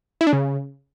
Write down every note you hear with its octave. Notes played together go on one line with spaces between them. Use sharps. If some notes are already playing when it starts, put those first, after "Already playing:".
E4
D4
C#3